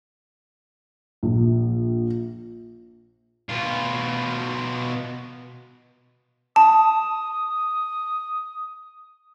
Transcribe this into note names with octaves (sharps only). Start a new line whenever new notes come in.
A#1
B2 F4
A5 D#6